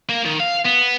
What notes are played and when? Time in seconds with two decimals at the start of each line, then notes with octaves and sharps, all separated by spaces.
0.09 A#3
0.25 D#3
0.40 F5
0.66 B3